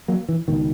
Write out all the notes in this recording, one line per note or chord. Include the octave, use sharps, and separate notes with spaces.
F#3 A#3
E3
C#2 B2 D#3